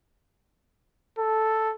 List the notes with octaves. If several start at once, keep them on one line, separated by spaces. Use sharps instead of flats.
A4